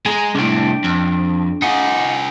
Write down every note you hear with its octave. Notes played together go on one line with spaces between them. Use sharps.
G#3 G#5 A#5
C2 A2 D4 G5
F2
D#4 F4 G#4 F#5